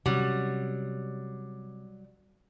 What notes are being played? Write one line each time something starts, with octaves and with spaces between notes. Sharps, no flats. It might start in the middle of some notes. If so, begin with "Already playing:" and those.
C3 F#3 G3 C#4